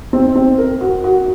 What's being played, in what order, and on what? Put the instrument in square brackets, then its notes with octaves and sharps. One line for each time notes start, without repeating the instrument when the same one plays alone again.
[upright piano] C4
C4
A#4
F#4
F#4